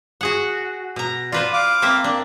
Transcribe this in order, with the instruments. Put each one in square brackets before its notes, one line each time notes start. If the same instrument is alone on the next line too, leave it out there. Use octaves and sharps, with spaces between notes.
[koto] F#4 G#4 F#5
B2 A#5
[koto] F4 B4 C5 [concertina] D5
[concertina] F5 D6
[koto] A#3 C4 E5
[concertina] A#3 [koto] D4